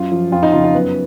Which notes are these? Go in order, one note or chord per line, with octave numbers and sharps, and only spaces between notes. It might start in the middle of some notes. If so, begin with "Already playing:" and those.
Already playing: F#2 F4
F3
F2 F4
D#4
C#3 F3 F4
F4
F#2 B3